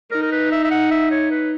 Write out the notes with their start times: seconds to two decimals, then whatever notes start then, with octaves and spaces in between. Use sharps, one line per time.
0.11 D#4 A#4
0.22 A#4
0.32 B4
0.52 E5
0.64 E5
0.71 F#5
0.91 E5
1.11 C#5
1.31 B4